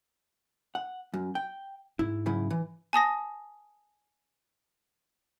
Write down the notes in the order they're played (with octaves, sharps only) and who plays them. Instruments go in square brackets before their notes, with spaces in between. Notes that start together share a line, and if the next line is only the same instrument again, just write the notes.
[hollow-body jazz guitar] F#5
F#2
G5
[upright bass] G#2 [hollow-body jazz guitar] E4
[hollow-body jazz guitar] C#3 F#3 E4
E3
[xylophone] G#5 A5 D#6 A#6